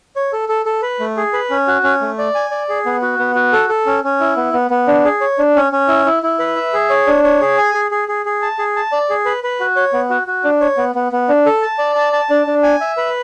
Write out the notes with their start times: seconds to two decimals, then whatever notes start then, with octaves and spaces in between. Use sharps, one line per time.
0.16 C#5
0.33 A4
0.49 A4
0.66 A4
0.82 B4
1.00 A3
1.17 G#4
1.33 B4
1.50 C#4
1.67 F#4
1.83 C#4
2.01 A3
2.18 D5
2.35 G#5
2.51 D5
2.69 G#4
2.86 B3
3.02 F#4
3.19 B3
3.35 F#4
3.53 A4
3.69 A4
3.86 C#4
4.04 C#4
4.20 E4
4.37 B3
4.53 B3
4.70 B3
4.88 D4
5.05 G#4
5.21 C#5
5.39 D4
5.56 C#4
5.72 C#4
5.88 E4
6.06 E4
6.23 E4
6.39 B4
6.56 E5
6.73 G#4
6.90 C#5
7.07 D4
7.24 C#5
7.41 G#4
7.58 G#5
7.74 G#4
7.91 G#4
8.08 G#4
8.26 G#4
8.42 A5
8.59 G#4
8.76 A5
8.92 D5
9.10 G#4
9.26 B4
9.44 B4
9.60 F#4
9.76 C#5
9.93 B3
10.10 F#4
10.27 F#4
10.44 D4
10.61 C#5
10.77 B3
10.95 B3
11.12 B3
11.29 D4
11.46 A4
11.62 A5
11.79 D5
11.95 A5
12.13 A5
12.30 D4
12.47 D4
12.63 G#5
12.81 E5
12.97 B4